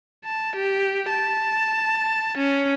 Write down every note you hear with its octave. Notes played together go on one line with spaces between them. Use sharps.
A5
G4
A5
C#4